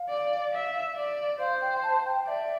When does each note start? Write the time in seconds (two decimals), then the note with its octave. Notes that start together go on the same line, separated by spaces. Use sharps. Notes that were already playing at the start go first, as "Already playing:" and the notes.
Already playing: F5
0.09 D5
0.53 E5
0.96 D5
1.39 C5 F5
1.61 G5
1.83 A5
2.05 G5
2.26 D5 E5